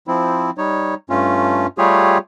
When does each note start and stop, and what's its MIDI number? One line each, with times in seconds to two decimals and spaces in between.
0.08 0.51 53
0.08 0.51 60
0.08 0.51 64
0.58 0.94 55
0.58 0.94 63
0.58 0.94 73
1.10 1.67 43
1.10 1.67 57
1.10 1.67 61
1.10 1.67 65
1.78 2.18 55
1.78 2.18 57
1.78 2.18 65
1.78 2.18 67
1.78 2.18 68
1.78 2.18 73